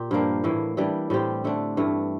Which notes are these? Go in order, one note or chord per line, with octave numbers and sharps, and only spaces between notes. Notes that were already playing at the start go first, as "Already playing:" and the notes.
Already playing: A#2 G4
G2 F3 A#3 D4
A2 E3 A#3
E3 G3 D4
A2 G3 C4 G4
D3 A3 D4
G2 E3 A3